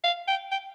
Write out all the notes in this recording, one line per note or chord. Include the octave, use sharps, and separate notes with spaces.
F5
G5
G5